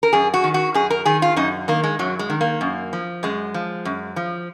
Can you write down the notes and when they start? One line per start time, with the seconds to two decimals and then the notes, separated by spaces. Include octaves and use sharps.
0.03 A#4
0.13 F#2 G#4
0.34 F#4
0.44 D#3
0.54 F#4
0.74 F#2 G#4
0.90 A#4
1.05 D#3 G#4
1.22 F4
1.36 F#2 D#4
1.68 D#3 A#3
1.84 G#3
1.99 F#2 F#3
2.19 G#3
2.30 D#3
2.41 A#3
2.61 F#2
2.93 F3
3.23 F#2 G#3
3.54 F3
3.85 F#2
4.16 F3